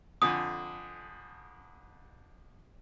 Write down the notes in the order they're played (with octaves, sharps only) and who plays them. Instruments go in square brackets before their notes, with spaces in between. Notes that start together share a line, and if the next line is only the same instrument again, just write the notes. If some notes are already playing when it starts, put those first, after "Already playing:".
[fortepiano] F2 D3 G#5 [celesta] D#6